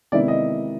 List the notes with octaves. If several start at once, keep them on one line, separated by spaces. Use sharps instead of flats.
C3 D#3 G#3 B3 E4 D5
D#5